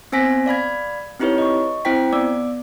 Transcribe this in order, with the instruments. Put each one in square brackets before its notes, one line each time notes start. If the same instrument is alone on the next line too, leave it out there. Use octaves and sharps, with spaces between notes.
[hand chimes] B3 C4 C5 G#5 A#6 B6
D5 F5 B5 G#6
C4 D#4 E4 G4 B4 C#5
D#5 C#6
C4 E4 C5 G5 B6
B3 D5 D6